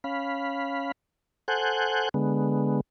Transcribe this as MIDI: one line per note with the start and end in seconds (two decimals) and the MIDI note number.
0.04 0.92 61
0.04 0.92 77
0.04 0.92 83
1.48 2.09 69
1.48 2.09 72
1.48 2.09 78
1.48 2.09 80
1.48 2.09 90
1.48 2.09 91
2.14 2.81 50
2.14 2.81 56
2.14 2.81 59